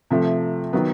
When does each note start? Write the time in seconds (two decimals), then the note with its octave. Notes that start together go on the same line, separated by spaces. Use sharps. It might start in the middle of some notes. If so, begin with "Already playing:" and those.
0.11 C3 F3 A3
0.73 D#3 F#3 B3